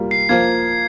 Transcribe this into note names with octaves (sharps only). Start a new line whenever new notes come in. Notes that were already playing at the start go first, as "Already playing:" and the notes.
Already playing: G3 A#3 F4
C7
F3 A#3 F4 G#6